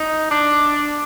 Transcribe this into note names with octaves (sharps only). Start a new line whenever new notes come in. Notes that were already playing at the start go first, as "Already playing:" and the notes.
Already playing: D#4
D4